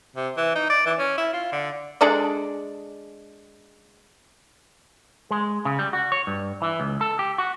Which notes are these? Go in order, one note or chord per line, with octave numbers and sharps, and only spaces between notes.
C3
E3
D#4
D5
E3
C#4
E4
F4
D3
G#3 D4 A4 D5
G#3
C#3
G3
F#4
C#5
G2
E3
C#2
A4
G4
F#4